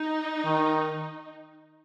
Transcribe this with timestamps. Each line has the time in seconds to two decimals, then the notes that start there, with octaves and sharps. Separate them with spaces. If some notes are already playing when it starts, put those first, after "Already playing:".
Already playing: D#4
0.45 D#3